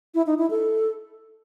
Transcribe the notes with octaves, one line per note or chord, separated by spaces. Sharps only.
E4
D#4
E4
A4